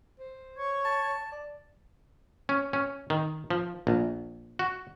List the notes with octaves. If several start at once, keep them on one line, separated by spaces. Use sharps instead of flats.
C5
C#5 C#6 G#6
A5
D5
C#4
C#4
D#3
F3
A#1
F#4